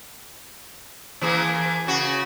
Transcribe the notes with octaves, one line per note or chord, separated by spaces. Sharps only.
E3 A#3 G#4
C#3 F#4